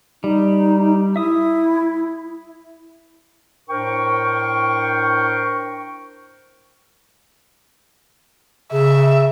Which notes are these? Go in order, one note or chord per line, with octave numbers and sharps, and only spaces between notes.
G3 D#4
E4 E5 D#6
A2 D4 A#4 C5 G5 C#6
C#3 E5